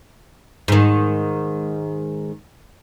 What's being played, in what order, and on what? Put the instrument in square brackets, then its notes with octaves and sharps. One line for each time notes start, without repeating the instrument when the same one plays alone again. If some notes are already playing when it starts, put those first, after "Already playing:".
[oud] G#2 D#3